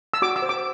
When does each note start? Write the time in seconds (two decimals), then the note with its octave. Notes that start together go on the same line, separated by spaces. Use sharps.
0.14 E6
0.22 F#4 D6
0.36 E6
0.42 C5
0.49 D6